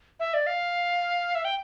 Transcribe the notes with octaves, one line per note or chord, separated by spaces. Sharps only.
E5
D5
F5
E5
G5